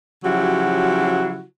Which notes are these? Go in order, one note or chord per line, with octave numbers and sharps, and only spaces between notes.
C#3 F3 F#3 E4 F#4 G4